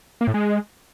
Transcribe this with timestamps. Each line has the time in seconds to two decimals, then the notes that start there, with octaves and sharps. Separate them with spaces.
0.21 A#3
0.27 A2
0.34 G#3